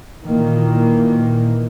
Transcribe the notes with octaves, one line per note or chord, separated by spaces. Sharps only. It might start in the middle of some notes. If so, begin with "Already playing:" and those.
A#2 D#3 E3 A#3